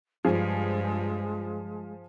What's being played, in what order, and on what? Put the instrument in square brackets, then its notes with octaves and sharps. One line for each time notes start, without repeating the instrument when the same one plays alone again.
[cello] G2 [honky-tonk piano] F3 G#4 [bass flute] G#3